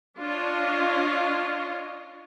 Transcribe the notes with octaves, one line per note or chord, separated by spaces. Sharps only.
D4 F4 C#5 D#5